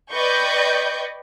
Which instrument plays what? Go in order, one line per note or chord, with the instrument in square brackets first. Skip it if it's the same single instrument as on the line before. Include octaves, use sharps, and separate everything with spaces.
[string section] B4 D5 D#5 G5 C#6 G6